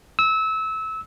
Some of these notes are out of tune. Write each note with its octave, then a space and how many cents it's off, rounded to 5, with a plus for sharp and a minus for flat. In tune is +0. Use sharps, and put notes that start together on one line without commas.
E6 -25